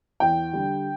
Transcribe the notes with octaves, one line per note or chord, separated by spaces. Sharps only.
E2 G5
D3 G3